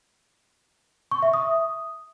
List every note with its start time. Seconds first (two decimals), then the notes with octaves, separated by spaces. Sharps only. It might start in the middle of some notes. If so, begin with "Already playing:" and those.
1.11 C#6
1.22 E5
1.33 D#6